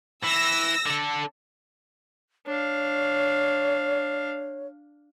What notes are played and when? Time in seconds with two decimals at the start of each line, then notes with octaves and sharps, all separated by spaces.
0.24 E3 E6 A#6
0.86 D3 A4
2.47 D4 C#5 F5